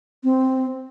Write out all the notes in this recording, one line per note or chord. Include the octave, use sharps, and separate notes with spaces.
C4